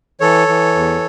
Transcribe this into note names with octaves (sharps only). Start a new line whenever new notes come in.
E3 A4 C#5
E3
E2